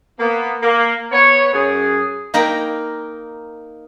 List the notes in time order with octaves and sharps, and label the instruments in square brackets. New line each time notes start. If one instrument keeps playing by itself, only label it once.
[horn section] A#3 B3
A#3
B3 C#5
F#2 G#4
[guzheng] A#3 D#4 A#4 G5 A#5 B5